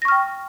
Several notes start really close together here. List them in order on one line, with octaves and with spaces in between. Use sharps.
A#6 C#6 F6 G5